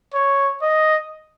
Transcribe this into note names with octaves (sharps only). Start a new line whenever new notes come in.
C#5
D#5